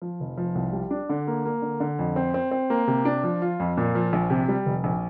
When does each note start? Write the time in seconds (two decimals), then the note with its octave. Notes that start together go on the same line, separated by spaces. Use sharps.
0.02 F3
0.20 F1
0.38 F3
0.55 C2
0.73 G3
0.91 D4
1.09 D3
1.28 A#3
1.45 A#3
1.62 D3
1.80 D3
1.99 F2
2.16 C4
2.34 C4
2.51 C4
2.70 A#3
2.87 C3
3.05 D4
3.24 F3
3.42 F4
3.60 F2
3.77 A#2
3.95 F3
4.13 A#1
4.30 C3
4.48 G3
4.66 F1
4.84 A#1